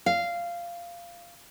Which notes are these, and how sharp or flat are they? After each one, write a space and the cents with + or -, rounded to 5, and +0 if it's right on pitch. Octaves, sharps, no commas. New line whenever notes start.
F5 -10